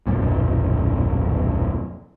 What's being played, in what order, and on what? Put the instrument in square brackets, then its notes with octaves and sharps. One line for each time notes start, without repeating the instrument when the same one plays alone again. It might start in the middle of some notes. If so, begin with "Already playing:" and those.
[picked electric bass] D#1 B1 F#2 A#2